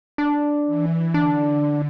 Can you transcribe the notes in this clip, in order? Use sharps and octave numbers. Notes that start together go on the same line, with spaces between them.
D4
E3
D3 D4